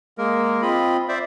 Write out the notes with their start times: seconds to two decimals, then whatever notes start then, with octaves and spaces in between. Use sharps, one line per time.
0.18 G#3 A#3 A#4
0.62 C4 F4 D#5 B5
1.09 C5 D5 E5